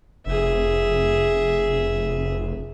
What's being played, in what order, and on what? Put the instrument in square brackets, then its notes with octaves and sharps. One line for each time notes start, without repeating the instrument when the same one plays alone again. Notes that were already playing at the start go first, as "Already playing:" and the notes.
[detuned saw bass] F1 [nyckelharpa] G#4 E5